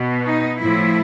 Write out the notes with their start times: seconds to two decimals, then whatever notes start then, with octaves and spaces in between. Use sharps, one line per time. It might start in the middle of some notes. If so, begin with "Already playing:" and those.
Already playing: B2
0.25 D#4
0.59 A2 F3 E4